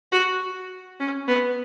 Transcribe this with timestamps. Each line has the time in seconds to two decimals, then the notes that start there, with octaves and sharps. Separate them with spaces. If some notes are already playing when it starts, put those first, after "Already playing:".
0.12 F#4
1.00 C#4
1.28 B3